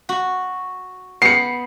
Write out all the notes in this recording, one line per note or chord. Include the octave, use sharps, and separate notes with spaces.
F#4
B3 C7 C#7